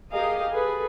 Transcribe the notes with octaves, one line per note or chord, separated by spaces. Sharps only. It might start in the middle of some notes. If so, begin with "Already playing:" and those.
G4 G#4 A#4 D#5 F5
G#4 A4 B4